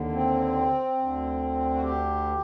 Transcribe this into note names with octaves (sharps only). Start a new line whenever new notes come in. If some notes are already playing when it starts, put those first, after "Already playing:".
Already playing: D#2 D3
C4
D2 D3
F#4
G4